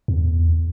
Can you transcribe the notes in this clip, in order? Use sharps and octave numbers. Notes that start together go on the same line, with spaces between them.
E2